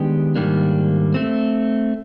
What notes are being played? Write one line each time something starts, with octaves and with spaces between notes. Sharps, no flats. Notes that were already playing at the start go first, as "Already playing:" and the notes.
Already playing: D#3 G#3 B3 D4 G4
G#2 D#3 G3 A#3 D4
A3 C4